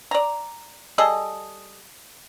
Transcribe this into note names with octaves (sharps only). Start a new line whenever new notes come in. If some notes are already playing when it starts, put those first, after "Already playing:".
D5 A#5
G3 G#4 A4 D#5